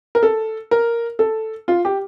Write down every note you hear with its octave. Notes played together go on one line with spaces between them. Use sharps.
A#4
A4
A#4
A4
F4
G4